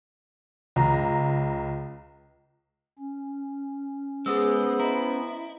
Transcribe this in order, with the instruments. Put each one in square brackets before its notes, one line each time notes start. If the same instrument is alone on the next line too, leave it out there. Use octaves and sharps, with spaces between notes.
[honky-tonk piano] C#2 A#5
[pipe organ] C#4
[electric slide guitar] G#3 [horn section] B3 C5 [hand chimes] G#4 D#6 E6
[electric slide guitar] E4 [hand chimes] D#5 A#5